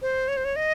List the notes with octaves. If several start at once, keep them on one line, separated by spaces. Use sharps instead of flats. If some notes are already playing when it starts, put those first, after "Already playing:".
C5
C#5
C5
C#5
D#5